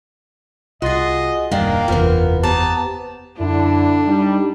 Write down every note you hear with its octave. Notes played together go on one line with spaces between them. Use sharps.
C2 F4 F#4 G#4 D#5 C6 A6
D#1 F#2 D#3 G3 A#3 D4 F4 F5
F#1 E2 C3 E3 B3 F4 A#4 C5
B3 G4 C5 A5 A#5
F#2 D3 D4 E4
G3 D#4